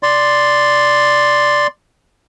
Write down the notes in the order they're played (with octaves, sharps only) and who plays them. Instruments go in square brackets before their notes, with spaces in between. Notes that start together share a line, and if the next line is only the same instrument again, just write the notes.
[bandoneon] D5 C6